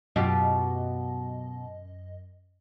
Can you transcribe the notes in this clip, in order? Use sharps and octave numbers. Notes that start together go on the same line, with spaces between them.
F#2 B2 F4 G4 D#5